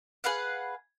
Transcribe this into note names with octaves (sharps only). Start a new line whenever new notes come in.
G#4 B4 F5 F#5